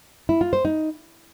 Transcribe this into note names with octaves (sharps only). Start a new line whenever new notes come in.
E4
F4
C5
D#4